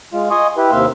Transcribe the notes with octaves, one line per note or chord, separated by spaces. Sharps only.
G#3 F4
D#5 G#5 C6 C#6 D#6
E4 G4 B4
D#2 C3 A#3 E5 F5 C6